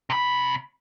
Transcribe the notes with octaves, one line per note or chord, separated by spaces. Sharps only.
C3 B5